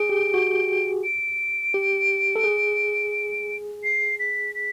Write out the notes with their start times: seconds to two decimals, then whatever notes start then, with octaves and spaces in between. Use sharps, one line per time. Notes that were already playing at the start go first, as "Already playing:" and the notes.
Already playing: G#4 D7
0.09 G4
0.34 F#4
1.04 D7
1.74 G4
2.36 A4
2.44 G#4
3.83 C7
4.19 B6
4.54 B6